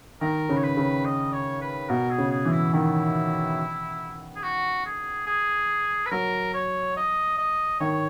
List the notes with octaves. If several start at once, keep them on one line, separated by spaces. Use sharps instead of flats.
D#3 A#4
C#3
C#5
B4
C#3
D#5
C#5
B4
B2 A#4
G#4
C#3
G#4
E3
E4
D#3 E4
G#4
F#4
G#4
G#4
B4
F#3 A#4
C#5
D#5
D#5
D#3 C#5